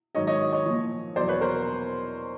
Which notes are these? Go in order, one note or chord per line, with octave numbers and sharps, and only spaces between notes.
G#2 D#3 F#3 C#5 D#5
C#5 D#5
C#5 D#5
A#2 F3
E2 B2 F#3 C5 D5
B4 C#5
A#4 C5